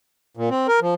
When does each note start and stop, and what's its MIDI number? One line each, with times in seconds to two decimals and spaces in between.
0.37 0.49 46
0.50 0.67 60
0.68 0.80 70
0.81 0.94 53